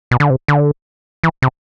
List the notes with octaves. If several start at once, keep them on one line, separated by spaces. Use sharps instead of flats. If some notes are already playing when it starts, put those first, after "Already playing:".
B2
D3
C3
D3
E3
C3